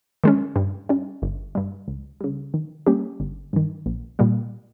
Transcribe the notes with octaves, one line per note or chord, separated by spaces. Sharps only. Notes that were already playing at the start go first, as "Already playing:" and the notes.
D#3 G#3 C#4
G2
G3 C#4
G1
G2 G3
C#2
C#3 G3
D#3
G3 A#3 C#4 G4
G1
G2 D#3
A#1
A#2 G3 A#3